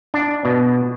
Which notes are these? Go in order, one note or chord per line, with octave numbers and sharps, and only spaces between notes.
D4
B2